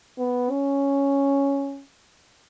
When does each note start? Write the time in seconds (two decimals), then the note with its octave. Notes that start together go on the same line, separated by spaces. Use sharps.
0.18 B3
0.50 C#4